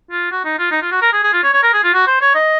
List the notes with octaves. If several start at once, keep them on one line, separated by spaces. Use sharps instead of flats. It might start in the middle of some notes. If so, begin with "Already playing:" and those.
F4
F#4
D#4
F4
D#4
F4
F#4
A#4
G#4
G#4
F4
C#5
C#5
A#4
G#4
F4
F#4
C5
C#5
D#5